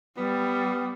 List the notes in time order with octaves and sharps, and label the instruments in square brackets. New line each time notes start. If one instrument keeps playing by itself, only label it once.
[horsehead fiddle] G3 [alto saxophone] B3